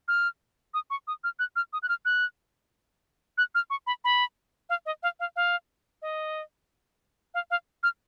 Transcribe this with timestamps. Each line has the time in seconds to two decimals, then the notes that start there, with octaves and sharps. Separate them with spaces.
0.08 F6
0.74 D#6
0.90 C#6
1.07 D#6
1.24 F6
1.39 F#6
1.56 F6
1.73 D#6
1.83 F#6
1.89 F6
2.05 F#6
3.38 F#6
3.55 F6
3.70 C#6
3.87 B5
4.04 B5
4.69 F5
4.86 D#5
5.03 F5
5.20 F5
5.36 F5
6.02 D#5
7.34 F5
7.51 F5
7.83 F6